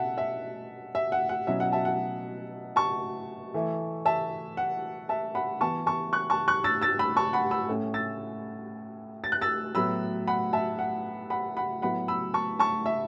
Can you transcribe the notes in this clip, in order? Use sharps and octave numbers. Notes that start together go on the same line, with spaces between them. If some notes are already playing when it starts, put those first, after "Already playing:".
Already playing: B2 A3 C#4 E5 F#5 A5
E5
E5
F#5
F#5
B2 F#3 C#4 E4 E5
F#5
E5 A5
F#5
A5 C#6
E3 A3 E4
E5 A5
F#5
E5 A5
F#5 B5
E3 B3 E4 A5 C#6
A5 C#6
C#6 F#6
A5 C#6
C#6 F#6
E6 A6
E6 A6
B5 E6
A5 C#6
F#5 B5
B5 E6
A2 A3 C#4
E6 A6
A6
F#6
E6 A6
A2 F#3 B3 B5 E6
F#5 B5
E5 A5
F#5
F#5 B5
F#5 B5
A2 F#3 B3 E4 F#5 B5
B5 E6
A5 C#6
A5 C#6
E5